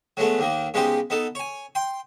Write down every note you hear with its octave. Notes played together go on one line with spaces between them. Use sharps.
F#3 G#3 A3 B3
D#2 D#3 A#3
C#3 G#3 B3 D#4 G4 C5
B3 D#4 A4
C#5 G#5
G5 C6